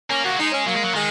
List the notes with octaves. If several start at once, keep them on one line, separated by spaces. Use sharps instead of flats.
A#3 C#4
D#3 F#4
F#3
G#3 D#4
C#4
F#3 A#3
G#3
F#3
D#3 G#3